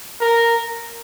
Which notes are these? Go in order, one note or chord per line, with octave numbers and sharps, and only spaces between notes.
A#4